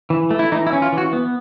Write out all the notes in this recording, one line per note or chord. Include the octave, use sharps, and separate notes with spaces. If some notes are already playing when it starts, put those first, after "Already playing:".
E3
A3
E4
E3 D#4
E4
C#4
F4
E3
F#4
B3